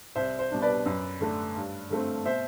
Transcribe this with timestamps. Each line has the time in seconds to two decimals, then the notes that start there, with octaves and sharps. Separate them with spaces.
0.15 C2 C5 E5
0.39 C5
0.51 B2 G3 D4
0.62 B4 D5
0.86 F#2
1.21 D3 A3 D4
1.56 G2
1.90 D3 A3 C4
2.25 B2 C5 E5